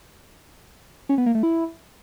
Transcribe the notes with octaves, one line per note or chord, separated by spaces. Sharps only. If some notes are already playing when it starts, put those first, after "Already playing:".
C#4
B3
A#3
A3
E4